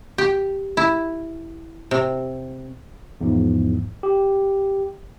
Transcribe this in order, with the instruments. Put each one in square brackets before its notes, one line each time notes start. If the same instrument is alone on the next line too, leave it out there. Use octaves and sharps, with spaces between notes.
[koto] G4
E4
C3
[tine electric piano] E2 G#2 F3
G4